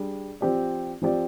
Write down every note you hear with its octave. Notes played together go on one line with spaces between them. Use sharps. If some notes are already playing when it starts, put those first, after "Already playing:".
Already playing: G3 D4 G#4
F3 C4 G4 D5
F3 C4 G4 D5